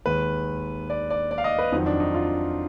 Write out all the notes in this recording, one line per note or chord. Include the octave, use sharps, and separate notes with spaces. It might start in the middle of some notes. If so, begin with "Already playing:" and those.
D#2 D#3 G#3 B4
D5
D5
D5
F5
D#5
B4
F2 D#3 F#3 D#4
D4
D#4
F4